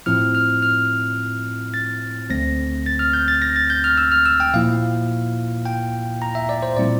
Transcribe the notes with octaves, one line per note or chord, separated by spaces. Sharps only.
A2 F3 C4 E4 F6
F6
F6
A6
D2 D3 A3 C4 A#6
A6
F6
G6
A6
A#6
A6
G6
F6
E6
F6
E6
G5
A#2 F3 A#3 E4 F5
G5
A#5
E5
D5
C5
A#2 G3 C4 E4 D5